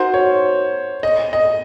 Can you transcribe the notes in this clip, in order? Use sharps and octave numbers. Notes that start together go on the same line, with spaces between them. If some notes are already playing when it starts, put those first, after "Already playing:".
Already playing: D#4 F#4 A#4 C5
C#5
D#5
D#5